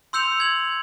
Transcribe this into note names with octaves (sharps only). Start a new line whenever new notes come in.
C6 E6 G6 C#7 F7
G#6 F#7